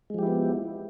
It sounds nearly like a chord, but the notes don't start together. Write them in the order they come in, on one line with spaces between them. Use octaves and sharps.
G#3 F3 G4 E4 B3